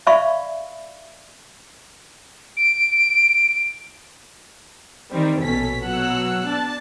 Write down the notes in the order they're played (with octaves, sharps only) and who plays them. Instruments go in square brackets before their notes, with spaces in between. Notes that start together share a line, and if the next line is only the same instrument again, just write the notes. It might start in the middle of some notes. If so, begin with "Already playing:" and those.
[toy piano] D5 E5 F5 B5 C#6
[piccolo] D7
[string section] D#3 G3 C4
A#1 B2 C#4 A4 B6
B2 F#3 F#5 E6 F#6
D4 A5